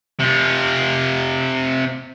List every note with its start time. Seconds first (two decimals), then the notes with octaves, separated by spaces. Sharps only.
0.20 C3 F4